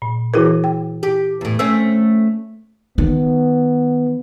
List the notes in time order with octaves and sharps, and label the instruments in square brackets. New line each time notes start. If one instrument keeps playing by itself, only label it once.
[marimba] A#2
[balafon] E3 F#4 B4 [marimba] E4 G#4 A#4
[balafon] G5
[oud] G4
E2 A2
[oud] A3 C4 C#4 [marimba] E6
[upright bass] D#3 [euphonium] B3